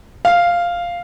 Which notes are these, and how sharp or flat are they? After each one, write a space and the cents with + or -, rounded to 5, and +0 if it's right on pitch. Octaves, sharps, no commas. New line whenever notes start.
F5 -5